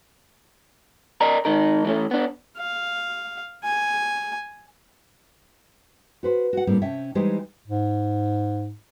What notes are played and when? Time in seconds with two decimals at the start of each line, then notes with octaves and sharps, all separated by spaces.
1.21 A#4 D5 D#5 A#5
1.45 G#2 D#3 D#4 A#4
1.85 E3 A3 C#4
2.11 B3 D4
2.57 F5
3.64 G#5
6.23 F#4 B4 C5
6.53 F#4 F#5
6.67 A2 G3 A#3 C4
6.82 C3 C#4 E5 G5 A5
7.15 E3 G3 G#3 D#4 G4 C5
7.68 G#2